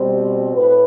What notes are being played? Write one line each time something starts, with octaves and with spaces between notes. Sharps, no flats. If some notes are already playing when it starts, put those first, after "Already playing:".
Already playing: B2 G3 C4
A2 B4